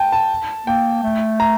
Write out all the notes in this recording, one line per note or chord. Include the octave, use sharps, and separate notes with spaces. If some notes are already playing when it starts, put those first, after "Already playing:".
Already playing: G5 A5
A5
A#3 G5
A3
A#5